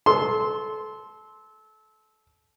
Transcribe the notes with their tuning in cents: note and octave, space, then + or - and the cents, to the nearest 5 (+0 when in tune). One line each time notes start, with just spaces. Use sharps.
A4 -25 C6 +0